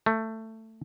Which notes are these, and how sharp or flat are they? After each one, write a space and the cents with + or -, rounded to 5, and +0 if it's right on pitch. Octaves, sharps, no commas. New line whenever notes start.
A3 +15